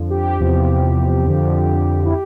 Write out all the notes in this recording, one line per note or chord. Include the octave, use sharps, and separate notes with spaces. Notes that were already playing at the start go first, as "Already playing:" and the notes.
Already playing: F2 D3 F3
G4
E2 C3 F3
F2 D3 F3
E4